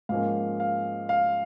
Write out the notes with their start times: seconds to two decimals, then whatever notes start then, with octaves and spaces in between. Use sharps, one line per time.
0.09 G#2 F3 A#3 C#4 F5
0.60 F5
1.09 F5